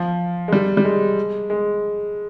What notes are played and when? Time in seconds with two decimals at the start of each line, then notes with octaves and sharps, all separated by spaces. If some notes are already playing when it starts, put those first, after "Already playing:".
Already playing: F3
0.48 G#3
0.53 G3
0.77 G3
0.85 G#3
1.50 G#3